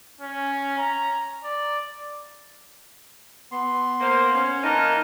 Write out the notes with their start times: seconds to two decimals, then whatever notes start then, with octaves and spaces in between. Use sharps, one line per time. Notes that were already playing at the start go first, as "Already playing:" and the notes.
0.21 C#4
0.78 A#5
1.44 D5
3.52 B3 C6
4.01 A#3 C5
4.35 C#4
4.64 E3 A#3 D#4 A#4 A5